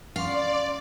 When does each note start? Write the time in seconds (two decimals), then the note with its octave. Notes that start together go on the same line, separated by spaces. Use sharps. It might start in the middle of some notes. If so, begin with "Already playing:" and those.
0.16 C#4 D5 F5 C6 D6